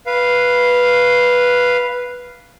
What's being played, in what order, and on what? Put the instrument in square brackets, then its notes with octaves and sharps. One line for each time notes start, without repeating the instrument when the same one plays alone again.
[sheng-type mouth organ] B4 F5